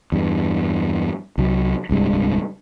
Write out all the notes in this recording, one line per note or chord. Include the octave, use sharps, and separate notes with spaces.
E2 G2
C2 F#3
D1 C2 G2 G#3